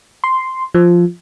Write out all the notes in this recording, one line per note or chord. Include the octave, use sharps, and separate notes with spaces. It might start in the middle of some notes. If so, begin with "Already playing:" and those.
C6
F3